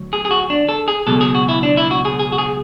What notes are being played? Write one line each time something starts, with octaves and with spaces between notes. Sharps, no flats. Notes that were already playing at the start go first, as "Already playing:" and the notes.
Already playing: D2 F#3
G#4
G#4
F#4
D4
A4
G#4
C#2 B2 F#3 A4
G#4
F#4
E4
D4
E4
F#4
G#4
G#4
F#4
G#4